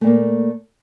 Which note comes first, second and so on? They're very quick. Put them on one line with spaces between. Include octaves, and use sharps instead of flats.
A3 A#2 A#3